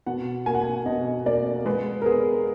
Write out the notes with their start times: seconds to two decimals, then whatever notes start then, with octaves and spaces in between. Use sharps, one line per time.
0.07 B2 F#5
0.46 A#3 G#5
0.55 F#5
0.62 G#5
0.86 B2 D#5
1.26 A#3 D5
1.66 G#3 B4
2.02 A#4
2.06 B3 G#4